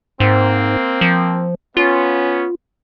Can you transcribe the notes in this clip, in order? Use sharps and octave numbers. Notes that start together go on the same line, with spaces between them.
G#2 A#3 C4
F3
B3 C#4 F4